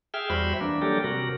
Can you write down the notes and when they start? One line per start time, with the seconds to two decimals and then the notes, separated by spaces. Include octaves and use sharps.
0.14 G#4 E5 G5 F6
0.30 E2 G3 F#4 C5 E5 B5
0.61 E3 A#3 D4
0.82 F#3 G3 D4 G4 A4 A#4
1.04 C3 F#4 A#4